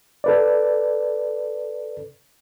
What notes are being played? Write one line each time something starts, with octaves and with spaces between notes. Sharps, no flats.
A4 B4 D5